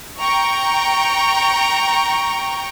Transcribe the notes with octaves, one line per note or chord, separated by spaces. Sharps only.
G5 A#5 C#6